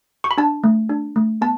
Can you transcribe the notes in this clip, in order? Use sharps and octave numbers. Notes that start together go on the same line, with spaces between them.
C#6
B5
D4 A5
A3
D4
A3
B3 A5